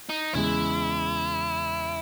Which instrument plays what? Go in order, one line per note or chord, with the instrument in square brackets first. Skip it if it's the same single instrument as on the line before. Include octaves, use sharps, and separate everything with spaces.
[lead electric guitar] D#4
[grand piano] E2 C#3 G#3 [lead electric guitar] E4